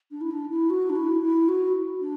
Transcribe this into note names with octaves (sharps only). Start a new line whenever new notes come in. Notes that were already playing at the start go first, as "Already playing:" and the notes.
D4
E4
D4
E4
F#4
D4
E4
E4
F#4
D4